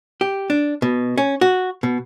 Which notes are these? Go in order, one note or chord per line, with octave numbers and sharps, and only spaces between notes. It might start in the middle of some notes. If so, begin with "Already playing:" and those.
G4
D4
B2
C#4
F#4
B2